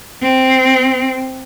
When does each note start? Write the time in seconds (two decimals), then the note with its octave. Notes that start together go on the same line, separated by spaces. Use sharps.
0.23 C4